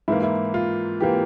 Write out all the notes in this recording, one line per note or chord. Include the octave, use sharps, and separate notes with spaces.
G#2 E3 A#3 E4
E4
F4
E3 A#3 G4